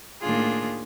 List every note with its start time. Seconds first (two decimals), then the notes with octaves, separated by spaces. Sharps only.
0.21 A2 D#3 A#3 D4 F4 G#4